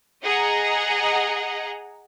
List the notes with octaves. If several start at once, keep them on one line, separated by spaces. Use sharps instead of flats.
G#4 D#5 F#5 A#5